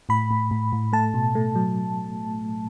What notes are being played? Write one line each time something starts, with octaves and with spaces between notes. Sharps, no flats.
A2 B5
A2
A2
A2
A3 A5
B2
A3
F#3